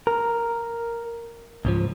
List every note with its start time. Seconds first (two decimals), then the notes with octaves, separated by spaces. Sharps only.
0.07 A#4
1.65 C#2 G#2 F3